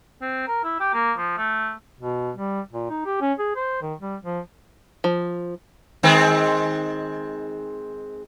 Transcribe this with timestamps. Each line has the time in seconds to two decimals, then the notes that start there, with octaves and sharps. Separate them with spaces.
0.21 C4
0.48 A#4
0.64 E4
0.80 G4
0.94 A#3
1.18 F3
1.38 A3
2.01 B2
2.36 G3
2.73 A#2
2.90 D#4
3.05 G4
3.21 C#4
3.39 G#4
3.56 C5
3.82 D#3
4.00 G3
4.24 F3
5.04 F3
6.03 D#3 G#3 C4